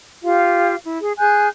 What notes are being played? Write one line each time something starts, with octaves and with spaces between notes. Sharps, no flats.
F4 G4 F5
E4
G#4
G#4 G#5 F#6 G6